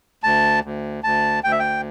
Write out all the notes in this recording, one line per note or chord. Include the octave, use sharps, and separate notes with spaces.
D2 A5
D2
D2 A5
D2 G5
E5
G5